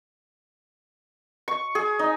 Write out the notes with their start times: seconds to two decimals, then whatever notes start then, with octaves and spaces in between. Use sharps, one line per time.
1.48 C#6
1.75 G#4
1.99 D#4